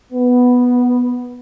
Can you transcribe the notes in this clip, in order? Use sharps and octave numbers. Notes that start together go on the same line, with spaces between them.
B3